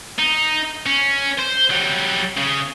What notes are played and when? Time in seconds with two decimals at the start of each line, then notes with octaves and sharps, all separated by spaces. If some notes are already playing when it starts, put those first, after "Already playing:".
0.19 D#4
0.86 C#4
1.39 C5
1.71 F#3 G3
2.37 C#3